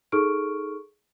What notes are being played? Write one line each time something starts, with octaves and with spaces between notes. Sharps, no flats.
D#4 G#4 A4 C#6 F6 D7